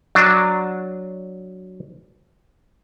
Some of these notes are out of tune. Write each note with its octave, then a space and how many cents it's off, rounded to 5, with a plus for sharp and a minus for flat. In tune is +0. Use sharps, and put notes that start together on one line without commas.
F#3 +0 D4 +0